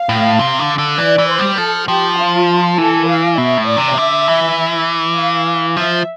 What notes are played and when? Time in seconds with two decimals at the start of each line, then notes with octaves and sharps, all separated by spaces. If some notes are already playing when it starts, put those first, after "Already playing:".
Already playing: F5
0.09 A2
0.39 C3
0.59 D3
0.78 D3
0.98 E3 D5
1.18 E3
1.29 C5
1.39 G3
1.58 F3 A4
1.88 F3 G4
2.18 F4
2.78 E3 A4
3.07 F5
3.37 B2 E5
3.57 A2
3.67 D5
3.76 C3
3.97 D3 E5
4.27 E3
5.16 F5
5.76 F3 E5